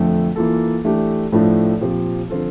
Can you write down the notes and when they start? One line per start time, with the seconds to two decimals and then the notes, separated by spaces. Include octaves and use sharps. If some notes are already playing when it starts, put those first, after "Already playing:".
Already playing: F2 D3 A3
0.36 E3 A#3 F4 A4
0.85 E3 A3 D4 G4
1.32 A2 F3 A3 D4
1.81 A#2 F3 C4 G4
2.30 D3 F3 C4 F4 A4